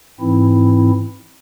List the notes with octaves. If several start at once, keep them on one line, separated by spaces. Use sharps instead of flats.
G#2 E3 C4 E4